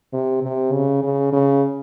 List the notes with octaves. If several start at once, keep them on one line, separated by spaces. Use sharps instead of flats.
C3
C3
C#3
C#3
C#3